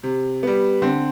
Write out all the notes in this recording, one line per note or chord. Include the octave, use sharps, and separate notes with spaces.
C3
G3 B3
D3 C4